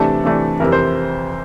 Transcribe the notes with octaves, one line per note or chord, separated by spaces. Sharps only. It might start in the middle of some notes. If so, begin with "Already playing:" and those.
Already playing: C3 E3 A3 D4 A4
C3 E3 A3 D4
F2 C3 E3 A#4
C5